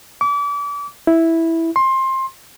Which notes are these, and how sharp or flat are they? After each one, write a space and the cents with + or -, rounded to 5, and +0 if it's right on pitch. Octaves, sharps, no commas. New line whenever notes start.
D6 -35
E4 -5
C6 +20